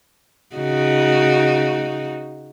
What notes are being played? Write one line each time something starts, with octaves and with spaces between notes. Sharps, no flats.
C#3 D#4 F#4